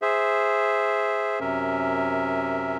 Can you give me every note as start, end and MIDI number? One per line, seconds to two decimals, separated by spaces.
0.02 1.40 68
0.02 1.40 72
0.02 1.40 76
1.41 2.77 42
1.41 2.77 48
1.41 2.77 61
1.41 2.77 70
1.41 2.77 76